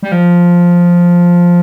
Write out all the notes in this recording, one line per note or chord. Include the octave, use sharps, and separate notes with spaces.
G3
F3